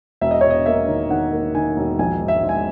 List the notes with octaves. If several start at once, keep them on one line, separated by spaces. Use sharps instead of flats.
E1 E5
D#5
E1 C#5
D#5
A#3 E5
D#3
D#3 F#5
A#3
D#3 G#5
E1
A#1 G#5
G#2
E5
G#2
G#5